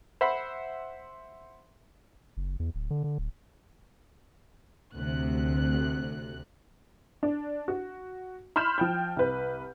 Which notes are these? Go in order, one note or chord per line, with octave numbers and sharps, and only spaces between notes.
C5 E5 F#5 B5 C6
F#1
E2
D1
D3
D3
D1
D2 C3 F#6
D4
F#4
B5 C6 F6 G6 E7
F3 G5 G6
C2 B4